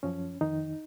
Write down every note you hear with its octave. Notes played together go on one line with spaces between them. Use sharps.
F#2 F3 C#4
F2 D#3 D#4